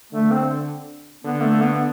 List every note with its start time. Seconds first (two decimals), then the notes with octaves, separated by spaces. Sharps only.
0.13 D3 A3
0.31 C4
1.24 D3 B3
1.42 A3
1.61 B3